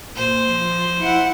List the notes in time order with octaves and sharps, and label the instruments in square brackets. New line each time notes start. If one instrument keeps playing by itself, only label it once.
[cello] A#2 [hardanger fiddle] C5
[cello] F3
E4 F#5